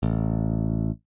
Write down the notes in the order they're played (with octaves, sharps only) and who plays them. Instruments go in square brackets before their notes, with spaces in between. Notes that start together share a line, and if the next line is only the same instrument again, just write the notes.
[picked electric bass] A1